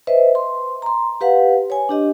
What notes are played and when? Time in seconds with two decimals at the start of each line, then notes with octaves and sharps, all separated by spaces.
0.07 B4 C5 D#5 E5
0.35 C6
0.82 A#5 C6
1.21 G4 B4 F5 F#5
1.70 C#5 G#5
1.89 D4 G4 D#5